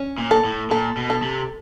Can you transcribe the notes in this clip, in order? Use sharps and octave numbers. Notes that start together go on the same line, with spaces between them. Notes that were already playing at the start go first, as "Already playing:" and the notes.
Already playing: C#4
A#2
A4
A2
A#2 A4
B2
A4
C3